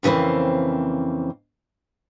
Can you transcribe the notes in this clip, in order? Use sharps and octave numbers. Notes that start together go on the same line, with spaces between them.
F2 C#3 E3 A#3 C4